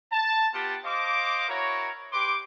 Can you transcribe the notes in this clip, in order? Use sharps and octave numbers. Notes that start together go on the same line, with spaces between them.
A5
B3 F4 G4 F#5 G5 A5
C5 D#5 F5 D6
E4 F#4 A#4 C#5
G4 B4 C6 D6